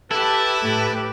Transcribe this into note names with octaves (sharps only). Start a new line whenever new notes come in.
E4 G4 A4 B4 A5
A2 G4